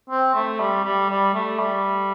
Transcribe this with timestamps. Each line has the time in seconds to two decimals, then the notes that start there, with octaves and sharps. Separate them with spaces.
0.10 C4
0.34 A3
0.60 G3
0.84 G3
1.09 G3
1.34 A3
1.59 G3